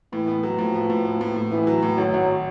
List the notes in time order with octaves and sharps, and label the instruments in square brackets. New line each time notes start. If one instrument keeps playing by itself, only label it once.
[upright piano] A2 [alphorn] E3
[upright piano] B3
F#3
[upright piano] A2 [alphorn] F3
[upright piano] B3
A2
B3
A2
A2
[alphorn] E3 [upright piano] B3
[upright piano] F#3
A2
[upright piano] G#1 [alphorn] F#3
[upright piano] G#1